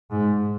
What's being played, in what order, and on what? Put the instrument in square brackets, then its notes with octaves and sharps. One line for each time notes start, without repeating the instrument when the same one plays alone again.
[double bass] G#2